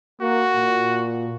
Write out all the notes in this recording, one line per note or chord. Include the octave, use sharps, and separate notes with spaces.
A#3 F#4
A#2